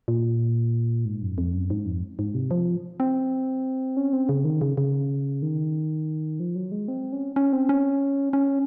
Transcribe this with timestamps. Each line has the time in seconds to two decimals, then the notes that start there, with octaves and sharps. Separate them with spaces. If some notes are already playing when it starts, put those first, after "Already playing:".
0.08 A#2
1.05 G#2
1.22 F#2
1.38 F2
1.54 F#2
1.70 G#2
1.86 F2
2.19 G#2
2.34 C3
2.51 F3
3.00 C4
3.97 C#4
4.13 C4
4.29 C#3
4.45 D#3
4.61 C#3
4.77 C#3
5.42 D#3
6.40 F3
6.55 F#3
6.72 G#3
6.88 C4
7.12 C#4
7.36 C#4
7.53 C4
7.69 C#4
8.33 C#4